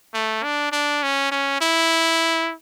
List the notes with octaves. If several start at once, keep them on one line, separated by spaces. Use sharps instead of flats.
A3
D4
D4
C#4
C#4
E4